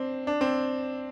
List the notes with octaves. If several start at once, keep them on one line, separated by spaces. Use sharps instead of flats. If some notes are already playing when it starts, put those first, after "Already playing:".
Already playing: C4 D4
D4
C4